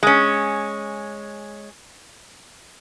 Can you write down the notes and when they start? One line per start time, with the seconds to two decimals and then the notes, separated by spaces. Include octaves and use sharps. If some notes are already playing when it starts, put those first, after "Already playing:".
0.03 G#3 C#4